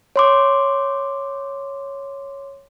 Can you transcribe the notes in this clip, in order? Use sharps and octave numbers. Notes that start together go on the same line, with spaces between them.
C#5 C6 D6